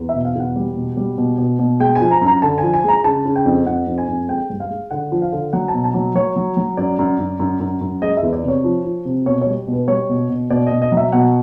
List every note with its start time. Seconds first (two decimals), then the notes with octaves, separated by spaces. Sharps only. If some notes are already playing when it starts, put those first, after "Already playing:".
Already playing: E2
0.09 E5
0.14 B2
0.25 F5
0.35 E2 F#5
0.56 G3
0.76 B2
0.97 G3
1.18 B2
1.38 B2
1.59 B2
1.80 G#3 G5
1.95 G#5
2.00 F3
2.11 A#5
2.21 F#2 A#5
2.42 D3 A5
2.58 F3 G#5
2.74 G#5
2.84 G#3 A#5
3.04 C#3 A5
3.25 C#3
3.36 G5
3.45 F2
3.66 F2 F#5
3.87 F2
3.98 G#5
4.08 F2
4.28 G#3 G5
4.50 G2
4.60 F5
4.70 G#3
4.91 D3 F#5
5.12 F3
5.22 F5
5.32 D3
5.53 F#3 F#5
5.68 A5
5.74 B2
5.84 A5
5.94 F#3
6.15 F#3 C#5
6.36 F#3
6.57 F#3
6.77 F#2 D5
6.99 F#2
7.19 F#2
7.39 F#2
7.60 F#2
7.81 F#2
8.02 G#3 D#5
8.17 E5
8.23 E2
8.33 D5
8.43 C3
8.48 C#5
8.64 F3
8.84 F3
9.05 C3
9.26 B2 C#5
9.41 G3 C#5
9.67 B2
9.73 B4
9.88 G3 C#5
10.09 B2
10.29 B2
10.50 B2 D5
10.67 D#5
10.72 B2
10.82 D#5
10.92 F#3
10.97 E5
11.12 B2 F#5